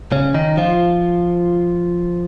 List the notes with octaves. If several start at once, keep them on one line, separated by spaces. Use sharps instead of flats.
C#3 C#4
D#3 D#4
F3 F4